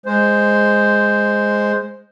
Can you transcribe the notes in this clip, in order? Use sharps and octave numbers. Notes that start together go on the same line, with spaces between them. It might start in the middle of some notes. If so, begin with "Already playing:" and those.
G#3 C5